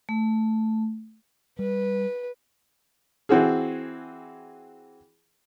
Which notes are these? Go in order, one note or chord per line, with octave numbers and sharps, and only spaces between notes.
A3
G3 B4
E3 C4 F#4 G#4